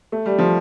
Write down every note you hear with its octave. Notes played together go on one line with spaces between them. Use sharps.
A3
G3
F3